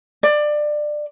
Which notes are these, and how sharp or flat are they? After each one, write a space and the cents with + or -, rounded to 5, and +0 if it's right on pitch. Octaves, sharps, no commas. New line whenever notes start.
D5 +20